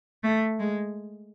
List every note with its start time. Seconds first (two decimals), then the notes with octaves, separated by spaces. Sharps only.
0.24 A3
0.59 G#3